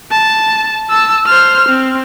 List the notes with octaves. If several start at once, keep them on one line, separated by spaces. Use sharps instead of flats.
A5
A5 E6
C5 F6
C4